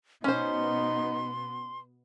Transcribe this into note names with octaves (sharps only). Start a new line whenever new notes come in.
B2 B3 C#4 D#4 C5 C6